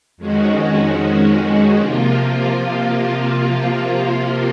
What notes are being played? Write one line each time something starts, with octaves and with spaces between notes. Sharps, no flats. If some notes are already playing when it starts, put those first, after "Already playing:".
F2 D#3 G#3 C#4 F#4
C3 F3 A#3 F4